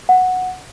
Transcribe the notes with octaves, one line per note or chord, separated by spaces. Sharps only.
F#5